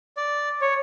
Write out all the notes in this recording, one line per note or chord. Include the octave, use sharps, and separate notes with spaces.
D5
C#5